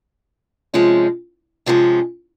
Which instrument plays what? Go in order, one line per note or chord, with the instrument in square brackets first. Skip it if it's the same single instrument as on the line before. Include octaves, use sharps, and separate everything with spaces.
[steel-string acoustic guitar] C3 F3 G#3 C#4
C3 F3 G#3 C#4